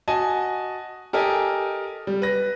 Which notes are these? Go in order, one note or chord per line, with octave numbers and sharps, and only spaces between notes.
F#4 D#5 G#5 A5
G4 A4 A#4 D#5 G5 G#5
G3
B4 A#6